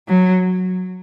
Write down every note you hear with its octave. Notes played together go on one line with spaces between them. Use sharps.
F#3